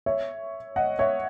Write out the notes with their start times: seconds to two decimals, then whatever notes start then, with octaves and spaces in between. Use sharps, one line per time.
0.06 C#5 E5
0.76 D#5 F#5
0.99 C#5 E5